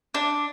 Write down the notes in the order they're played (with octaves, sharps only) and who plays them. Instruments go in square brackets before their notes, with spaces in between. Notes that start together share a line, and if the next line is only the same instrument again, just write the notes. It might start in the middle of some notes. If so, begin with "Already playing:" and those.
[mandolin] D4